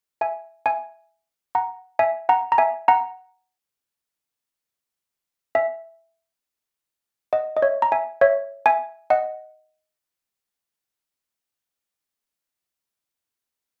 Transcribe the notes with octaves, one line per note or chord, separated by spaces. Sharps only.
E5 G#5
E5 G#5
F#5 A#5
E5 G#5
F#5 A#5
A#5
E5 G#5
F#5 A#5
E5 G#5
D#5 F#5
D#5
C#5 E5
A#5
E5 G#5
C#5 E5
E5 G#5
D#5 F#5